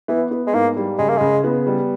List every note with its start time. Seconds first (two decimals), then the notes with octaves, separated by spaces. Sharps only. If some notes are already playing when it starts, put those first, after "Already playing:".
0.08 E3 B3
0.31 B3
0.47 G#3
0.53 G#2 A#3
0.77 G3
0.98 C#3 G#3
1.09 A#3
1.17 C#3 G#3
1.44 B3
1.67 G3